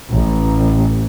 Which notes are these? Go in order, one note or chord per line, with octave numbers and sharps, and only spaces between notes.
A1